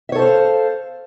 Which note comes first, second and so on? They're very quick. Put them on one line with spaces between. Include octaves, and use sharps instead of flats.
E5 C#5 A4 C5 F5